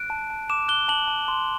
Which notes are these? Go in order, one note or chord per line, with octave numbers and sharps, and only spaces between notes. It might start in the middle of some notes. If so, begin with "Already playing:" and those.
Already playing: F#6 D7
A5
A5
D6 E7
F#6 G7
A5 F#7
A5
C6